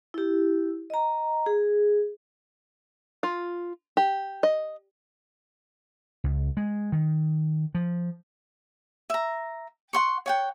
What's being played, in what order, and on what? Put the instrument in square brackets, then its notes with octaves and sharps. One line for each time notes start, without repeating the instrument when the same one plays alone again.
[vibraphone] E4 G4
D#5 A#5
G#4
[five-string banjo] F4
G4
D#5
[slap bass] C#2
G#3
D#3
F3
[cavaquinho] E5 A#5
F#5 C6 C#6
C#5 F#5 G5